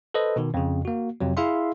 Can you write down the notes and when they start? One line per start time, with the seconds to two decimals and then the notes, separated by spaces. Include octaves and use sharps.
0.14 A4 B4 C5 D#5
0.36 B2 D#3
0.54 F2 C#3
0.85 A#3 F#4
1.21 F2 C3 F#3
1.37 E4 G#4 E5 F5 C6